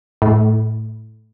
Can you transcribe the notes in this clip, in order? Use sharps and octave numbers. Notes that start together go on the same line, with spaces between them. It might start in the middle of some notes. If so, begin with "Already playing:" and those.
A2